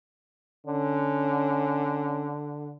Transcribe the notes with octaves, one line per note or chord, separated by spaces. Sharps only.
D3 C#4